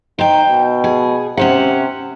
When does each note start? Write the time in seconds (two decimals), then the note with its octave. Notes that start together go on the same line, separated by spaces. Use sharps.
0.19 D#4 C5 G5
0.49 B2
0.84 G#4
1.37 C3 C#4 C5 F#5